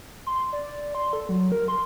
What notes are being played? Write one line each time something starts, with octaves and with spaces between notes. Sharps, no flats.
C6
D5
C6
A4
F#3
A#4
C6